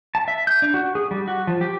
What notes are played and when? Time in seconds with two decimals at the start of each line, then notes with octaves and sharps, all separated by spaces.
0.15 A5
0.28 E5
0.47 G6
0.62 D4
0.74 F#4
0.95 G#4
1.11 G3
1.28 F#4
1.47 F3
1.61 G4